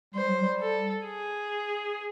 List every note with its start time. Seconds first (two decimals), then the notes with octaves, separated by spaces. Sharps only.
0.14 G3 C5
0.28 F#3
0.41 G3
0.61 A4
1.05 G#4